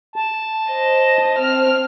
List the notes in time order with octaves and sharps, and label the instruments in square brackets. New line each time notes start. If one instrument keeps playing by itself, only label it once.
[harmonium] A5
[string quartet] C5 D#5
C4 F6